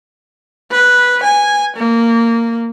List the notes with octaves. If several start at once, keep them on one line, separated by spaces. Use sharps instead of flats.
B4
G#5
A#3